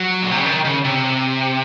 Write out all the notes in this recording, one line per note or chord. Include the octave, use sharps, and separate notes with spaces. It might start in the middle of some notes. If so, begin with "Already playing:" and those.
Already playing: F#3
A#2
C3
C#3
D#3
C#3
C3